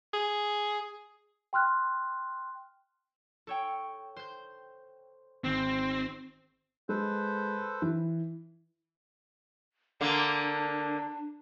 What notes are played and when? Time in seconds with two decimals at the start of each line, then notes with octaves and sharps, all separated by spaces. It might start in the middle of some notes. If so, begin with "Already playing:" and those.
0.14 G#4
1.53 G5 C6 F6 F#6
3.47 A4 C#5 G5
4.16 C5 G6
5.44 G#1 C4
6.89 G#3 A4 B4 C5
7.82 E3
10.01 D3 A#3 D4